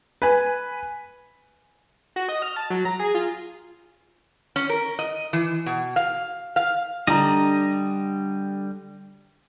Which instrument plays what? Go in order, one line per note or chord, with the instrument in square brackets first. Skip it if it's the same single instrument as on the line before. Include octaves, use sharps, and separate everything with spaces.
[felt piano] B4 G#5
[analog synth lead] F#4
D#5
F6
A5
F#3
A#5
G#4
F4
[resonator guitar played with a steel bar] C#4
A#4
D#5
E3
B2
F5
F5
[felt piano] D3 [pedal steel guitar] G3 D#5 [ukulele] D4 A#5